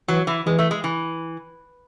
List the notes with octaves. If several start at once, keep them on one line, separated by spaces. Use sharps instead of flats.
E3 F#3
E3
E3 G#3
A3
G#3
E3